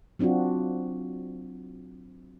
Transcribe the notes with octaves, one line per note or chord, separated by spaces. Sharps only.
F#3 C4 D4 F4 F#4